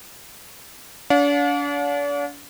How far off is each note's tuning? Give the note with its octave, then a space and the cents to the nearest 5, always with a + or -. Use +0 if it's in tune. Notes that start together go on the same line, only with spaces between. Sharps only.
D4 -40 F5 +45